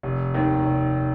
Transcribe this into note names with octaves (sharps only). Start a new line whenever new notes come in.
F1
D#2 D#3
F1